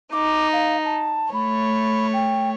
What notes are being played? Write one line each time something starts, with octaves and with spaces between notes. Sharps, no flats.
D#4 D6
F5
A5
A3 C#5 B5
G5